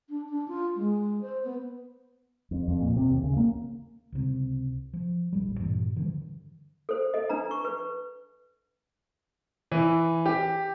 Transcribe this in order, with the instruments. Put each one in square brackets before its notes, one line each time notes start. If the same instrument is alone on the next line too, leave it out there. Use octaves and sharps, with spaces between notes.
[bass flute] D4
D4
F4
G#3
C5
B3
[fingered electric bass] F2
F2
A#2
C3
D#2
C#3
A#3
C#2 C3
F3
D#1 A1 G3
G2 A#2 E3
D3 E3 F#3 G3
[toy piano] A4 C5
A4 D#5
D4 B4 A#5
C#6
B4
[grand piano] E3
G4